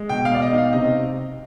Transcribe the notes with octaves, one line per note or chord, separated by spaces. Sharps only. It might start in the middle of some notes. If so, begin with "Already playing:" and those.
Already playing: G#3
B2 G5
F5
B2 D5
D#5
D#4
F5
C3 D#5